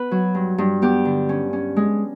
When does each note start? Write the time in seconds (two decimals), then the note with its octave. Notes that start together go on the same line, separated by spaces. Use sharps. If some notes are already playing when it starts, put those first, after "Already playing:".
Already playing: B3 B4
0.11 F#3
0.35 G2
0.58 G2
0.82 B3 G4
1.05 D3
1.29 C#4
1.53 C#4
1.76 G#3